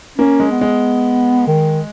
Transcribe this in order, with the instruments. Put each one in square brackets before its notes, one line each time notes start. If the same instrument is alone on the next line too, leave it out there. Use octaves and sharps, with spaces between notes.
[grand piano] A#3 [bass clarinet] C#4
[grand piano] G#3
[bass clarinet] B3
[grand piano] G#3
[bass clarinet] D#3